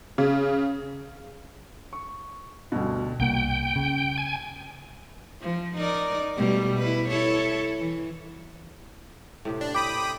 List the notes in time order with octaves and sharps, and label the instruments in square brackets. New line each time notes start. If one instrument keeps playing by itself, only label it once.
[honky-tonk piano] C#3
[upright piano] C#6
D2 G2 B2
[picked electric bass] C2 A#3 [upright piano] F#5 [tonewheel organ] G5
[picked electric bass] C#3
[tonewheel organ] G#5
[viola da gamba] F3
D#4 A#4 D5
B2 G3 A3
E4 B4
E4 A4 C#5
E3
[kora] A2 C3 G4
[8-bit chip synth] D4
[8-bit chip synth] G5 B5 D#6 [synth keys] D6
[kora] E4 C5